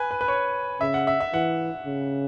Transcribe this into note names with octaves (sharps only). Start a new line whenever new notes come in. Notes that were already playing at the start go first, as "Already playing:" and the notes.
Already playing: B4 G#5
B4
B4
C#5
C#3 E5
F#5
E5
E5
E3 F#5
C#3